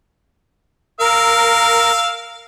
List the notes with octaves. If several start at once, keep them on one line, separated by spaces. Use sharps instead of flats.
A#4 F5 E6